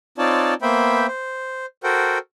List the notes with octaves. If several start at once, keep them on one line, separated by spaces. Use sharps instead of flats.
C4 D#4 F4 C#5 D5 A5
A#3 B3 C5 E5 G5 B5
C5
F#4 A4 A#4 C5 F#5 G5